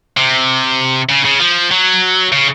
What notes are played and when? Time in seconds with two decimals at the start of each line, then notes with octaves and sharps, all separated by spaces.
0.17 C3
1.10 C#3
1.25 C#3
1.40 F3
1.71 F#3
2.32 C#3